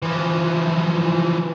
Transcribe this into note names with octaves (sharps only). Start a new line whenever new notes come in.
E3 F3